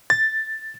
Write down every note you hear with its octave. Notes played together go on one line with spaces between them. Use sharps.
A6